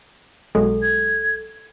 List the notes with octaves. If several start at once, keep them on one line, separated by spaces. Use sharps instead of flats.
B1 F#3 G#3 A4
G#6